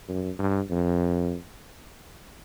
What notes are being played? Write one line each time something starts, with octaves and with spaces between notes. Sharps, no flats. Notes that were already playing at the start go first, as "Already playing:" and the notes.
F#2
G2
F2